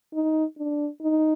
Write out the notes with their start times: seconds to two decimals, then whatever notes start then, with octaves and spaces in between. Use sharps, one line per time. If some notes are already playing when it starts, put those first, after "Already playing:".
0.14 D#4
0.58 D4
1.02 D#4